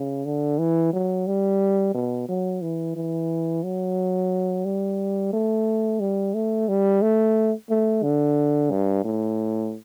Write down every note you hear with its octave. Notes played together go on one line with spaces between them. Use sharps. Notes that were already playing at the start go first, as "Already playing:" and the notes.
Already playing: C#3
D3
E3
F#3
G3
B2
F#3
E3
E3
F#3
G3
A3
G3
A3
G3
A3
A3
D3
G2
A2